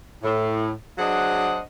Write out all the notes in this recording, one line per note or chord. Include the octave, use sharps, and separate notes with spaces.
A2
F#3 D4 G#4 C5 D#5 F#5